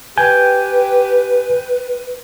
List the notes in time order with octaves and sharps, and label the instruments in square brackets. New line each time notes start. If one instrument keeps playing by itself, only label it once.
[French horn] G4 [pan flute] B4 [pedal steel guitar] G5 [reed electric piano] G#5